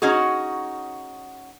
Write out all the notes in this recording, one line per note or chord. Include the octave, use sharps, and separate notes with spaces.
C#4 D#4 F#4 G#4